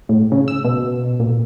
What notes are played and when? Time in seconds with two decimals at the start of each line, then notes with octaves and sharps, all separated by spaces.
0.09 A2
0.32 C#3
0.48 E6
0.64 B2
1.20 A#2